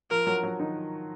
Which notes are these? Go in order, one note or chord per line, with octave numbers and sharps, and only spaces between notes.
F3 F4 A#4
F#3 F#4
F#3 F#4
D#3 D#4